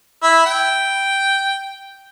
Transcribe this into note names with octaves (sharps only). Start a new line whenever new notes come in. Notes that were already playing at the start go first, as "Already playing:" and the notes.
E4
G5